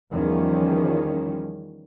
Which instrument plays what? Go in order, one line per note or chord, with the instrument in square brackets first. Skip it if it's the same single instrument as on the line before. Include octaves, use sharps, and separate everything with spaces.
[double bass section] E2 D#3 F3 G3 C#4